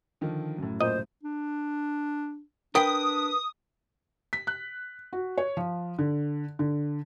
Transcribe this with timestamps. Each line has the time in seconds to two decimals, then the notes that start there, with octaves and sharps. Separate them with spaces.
0.21 D3 D#3 F3
0.58 F#2 A2
0.81 A#2 C5 D#5
1.23 D4
2.75 D4 A#4 B4 G5 D#6
4.33 B6
4.47 F#6
5.13 F#4
5.38 C#5
5.57 F3
5.99 D3
6.59 D3